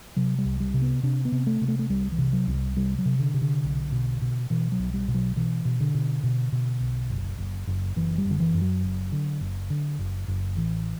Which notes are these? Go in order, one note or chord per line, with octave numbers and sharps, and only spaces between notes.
C3 F#3
G3
C2
G3
C3
B3
C3 D4
B3
C3
A3
C3
A3
A3
C2 G3
E3
C3
F#3
C2
G3
C3 G3
F#3
C3
D3
C3
D3
B1
B2
B2
B2 E3
F#3
B1
G3
B2
F#3
B2 E3
B2
D3
B2
B2
B2
B1
F#1
F#1
F#1
F#1 E3
G3
F#1
D3
E3
F#2
F#3
F#1
D3
F#1
D3
F#1
F#1
A1 E3